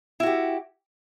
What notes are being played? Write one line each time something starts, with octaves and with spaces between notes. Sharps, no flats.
E4 F#4 G4